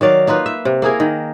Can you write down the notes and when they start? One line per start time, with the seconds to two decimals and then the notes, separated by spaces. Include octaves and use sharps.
0.01 D#3 F#3 D5 F5
0.27 A#3 D#4 F4 B4
0.46 E5
0.65 C3
0.82 A#3 E4 G#4 A#4
1.00 D#3